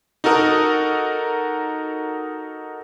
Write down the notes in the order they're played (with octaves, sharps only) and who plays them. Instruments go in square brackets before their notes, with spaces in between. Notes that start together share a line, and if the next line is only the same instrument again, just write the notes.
[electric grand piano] D#4 F#4 A4 A#4 F#5 D#6